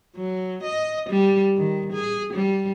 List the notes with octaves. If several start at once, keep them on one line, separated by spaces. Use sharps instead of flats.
F#3
D#5
G3
D#3
G#4
G3